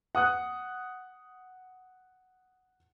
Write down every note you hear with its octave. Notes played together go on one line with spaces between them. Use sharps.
F#5 D#6 F#6